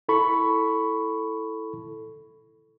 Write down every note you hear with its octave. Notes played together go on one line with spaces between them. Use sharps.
E4 A4 B5 C#6